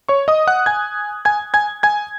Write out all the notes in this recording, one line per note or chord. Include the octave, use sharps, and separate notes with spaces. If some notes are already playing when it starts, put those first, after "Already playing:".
C#5 C#6
D#5 D#6
F#5 F#6
G#5 G#6
G#5 G#6
G#5 G#6
G#5 G#6